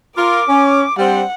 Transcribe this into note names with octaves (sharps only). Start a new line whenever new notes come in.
F4 A#4 D6
C#4
G3 C4 D4 F#5